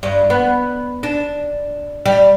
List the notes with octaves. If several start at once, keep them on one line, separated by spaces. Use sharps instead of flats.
G2
B3
D4
G3